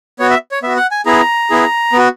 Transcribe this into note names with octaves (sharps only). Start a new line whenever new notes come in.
B3 F#4 C#5
E5
C#5
B3 F#4 E5
F#5
G#5
B3 E4 G#4 A#5
B3 E4 G#4
B3 F#4